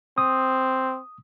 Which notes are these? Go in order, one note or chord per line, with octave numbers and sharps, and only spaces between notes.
C4 D#6